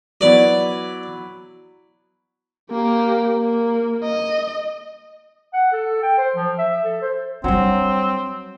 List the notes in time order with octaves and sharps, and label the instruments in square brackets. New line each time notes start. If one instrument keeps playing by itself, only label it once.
[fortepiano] F#3 B3 E4 [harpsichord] D5
[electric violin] A#3 G4
A#3
D#5
[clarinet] F#5
A4
G5
C5
F3
E5
A4
C5
[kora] F#3 [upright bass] G3 D4 [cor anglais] C4